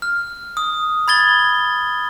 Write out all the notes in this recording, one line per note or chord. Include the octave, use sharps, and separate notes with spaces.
F6
D#6
B5 G#6 A6 G7